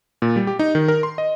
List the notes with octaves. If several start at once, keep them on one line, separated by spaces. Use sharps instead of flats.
A#2
G3
G4
D#4
D#3
A#4
C6
D#5